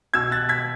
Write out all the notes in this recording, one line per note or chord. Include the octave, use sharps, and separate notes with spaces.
B2 E6 G#6
F#6 A6
G#6 B6